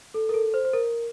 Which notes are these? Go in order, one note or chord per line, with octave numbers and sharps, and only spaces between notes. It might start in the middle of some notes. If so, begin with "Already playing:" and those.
A4
A#4
A4
C5
C5
A#4